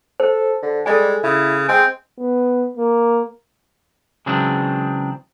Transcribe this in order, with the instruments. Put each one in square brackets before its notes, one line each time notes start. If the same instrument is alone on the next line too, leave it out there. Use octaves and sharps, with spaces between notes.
[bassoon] A4 [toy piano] C5
[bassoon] D3
[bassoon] G3 [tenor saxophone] G#3 [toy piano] A4 D#5 G#5
[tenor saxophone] C#3 [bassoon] E4
[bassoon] G#3 [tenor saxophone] C4 [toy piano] G#5
[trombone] B3
A#3
[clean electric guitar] C#3 E3 F#3 G#3 C4 D4